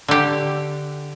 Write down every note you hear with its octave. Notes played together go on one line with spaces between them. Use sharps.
D3 G4